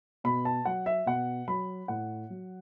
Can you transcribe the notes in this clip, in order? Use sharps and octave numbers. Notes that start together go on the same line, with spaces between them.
B2 B5
A5
F#3 F#5
E5
B2 F#5
F#3 B5
A2 F#5
F#3